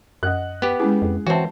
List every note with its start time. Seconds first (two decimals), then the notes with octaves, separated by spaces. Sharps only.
0.23 F#2 D#5 F#5 F#6
0.62 B3 G4
0.80 G#3 C#4 E4 G#4
1.02 F2
1.27 E3 C4 F#4 C#5 E5 A5